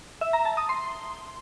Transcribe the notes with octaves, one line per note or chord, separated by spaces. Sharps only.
E5
A#5
A5
D#6
C6